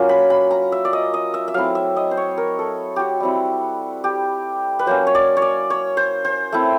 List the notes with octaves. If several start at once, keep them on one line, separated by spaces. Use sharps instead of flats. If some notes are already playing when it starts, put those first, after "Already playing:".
Already playing: F#3 A#3 C#4 F4
B5
B5
A#5
E5
D5
D#5
D#5
E5
E5
F#3 A3 C4 E4 F5
E5
D#5
C5
C#5
A#4
A4
F#4 G4
G3 C4 E4
G4
B4
F#3 A#3 C#4 C5
C#5
D5
C#5
D5
C#5
C5
C5
A3 C4 E4